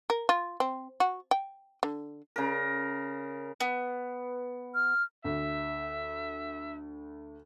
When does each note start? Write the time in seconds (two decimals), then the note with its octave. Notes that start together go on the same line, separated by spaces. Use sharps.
0.10 A#4
0.29 F4
0.60 C4
1.00 F#4
1.31 G5
1.83 D3
2.36 C#3 A#4
3.60 B3
4.75 F6
5.24 D2 E5